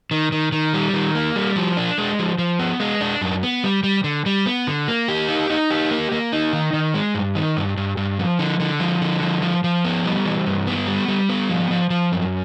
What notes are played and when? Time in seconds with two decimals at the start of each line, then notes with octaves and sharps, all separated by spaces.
0.11 D#3
0.32 D#3
0.52 D#3
0.74 G3
0.94 D#3
1.15 A#3
1.36 G3
1.56 F3
1.77 D4
1.98 G#3
2.19 F3
2.38 F3
2.59 B3
2.80 G#3
3.01 D4
3.21 F#2
3.43 B3
3.64 G3
3.83 G3
4.04 D3
4.26 G3
4.46 B3
4.67 D3
4.88 A#3
5.08 G4
5.29 D#4
5.50 D#4
5.71 G4
5.91 A#3
6.12 A#3
6.32 D#4
6.53 D#3
6.73 D#3
6.94 G#3
7.15 G2
7.35 D#3
7.57 G2
7.77 G2
7.97 G2
8.19 F3
8.39 D3
8.60 D3
8.80 F3
9.01 D3
9.22 F3
9.42 F3
9.64 F3
9.85 B3
10.05 G3
10.25 E3
10.47 G2
10.67 B3
10.87 G3
11.08 G3
11.29 B3
11.50 F3
11.71 F3
11.90 F3
12.12 F#2